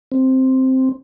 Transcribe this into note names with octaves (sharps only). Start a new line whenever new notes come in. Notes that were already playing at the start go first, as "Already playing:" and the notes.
C4